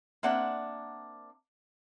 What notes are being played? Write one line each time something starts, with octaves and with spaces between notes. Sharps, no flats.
A#3 C4 D4 E5 F#5